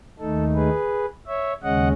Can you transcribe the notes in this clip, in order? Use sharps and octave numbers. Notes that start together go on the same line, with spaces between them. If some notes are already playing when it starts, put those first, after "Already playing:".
D#2 D#3 A3 D#4 A4
G#4 B4
C#5 E5
D#2 C#3 G#3 C#4 D#5 F#5